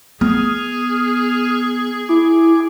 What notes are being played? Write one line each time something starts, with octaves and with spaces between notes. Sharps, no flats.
B3 G#4 D#6 F6
E4 G#5 D6